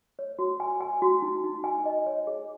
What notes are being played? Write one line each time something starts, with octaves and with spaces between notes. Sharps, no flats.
C#5
F#4
G#5
G#5
F#4
D#4
D#4
G#5
D#5
C#5
G#4